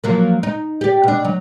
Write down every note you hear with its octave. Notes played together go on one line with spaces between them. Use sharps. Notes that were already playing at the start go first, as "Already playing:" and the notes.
F3 F#3 A#3
D#4
G4 D5
B2 D4
F#3